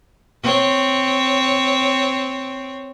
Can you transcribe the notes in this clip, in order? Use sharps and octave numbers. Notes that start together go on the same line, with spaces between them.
C4 C#5